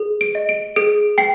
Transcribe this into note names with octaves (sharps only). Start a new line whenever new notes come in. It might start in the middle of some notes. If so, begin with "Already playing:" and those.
Already playing: G#4
D7
D#5
D7
G#4 D7
G5 C7